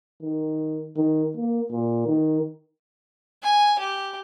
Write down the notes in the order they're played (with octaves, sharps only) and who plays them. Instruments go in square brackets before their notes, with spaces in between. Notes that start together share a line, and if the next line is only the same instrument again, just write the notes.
[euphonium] D#3
D#3
A#3
A#2
D#3
[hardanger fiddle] G#5
G4